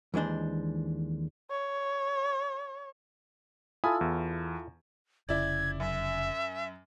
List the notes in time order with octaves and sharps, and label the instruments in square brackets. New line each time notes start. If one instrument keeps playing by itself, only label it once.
[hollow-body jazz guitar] D#2 E3 G#3 D4 C5
[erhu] C#5
[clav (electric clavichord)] E4 F4 A4 [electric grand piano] G#5 B5 D#6
[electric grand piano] E2
[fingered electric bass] F1 C#3 [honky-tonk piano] E4 D5 [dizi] G#6
[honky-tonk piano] F#2 [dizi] E5